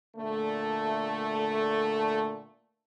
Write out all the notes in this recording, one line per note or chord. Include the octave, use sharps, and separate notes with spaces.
A#2 D3 A3